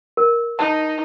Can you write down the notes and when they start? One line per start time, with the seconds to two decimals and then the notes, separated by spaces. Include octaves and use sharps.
0.17 A#4
0.59 D#4 A5